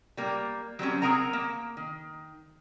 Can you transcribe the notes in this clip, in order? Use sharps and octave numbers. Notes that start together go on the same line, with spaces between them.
G3 A#3
F#3 G3 C4 C#4
C4 C#4 G#4 A#4 F#5 A#5
A#3
D#3